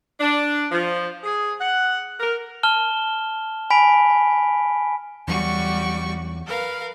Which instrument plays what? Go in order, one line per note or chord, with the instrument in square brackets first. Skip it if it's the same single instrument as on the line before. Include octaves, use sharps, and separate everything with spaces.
[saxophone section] D4
F3
G#4
F#5
A#4
[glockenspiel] A5 F6 E7 G7
G#5 B5 B6 D7
[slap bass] E2 F#3 [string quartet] G3 F#4 C#6
[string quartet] A#4 B4 F5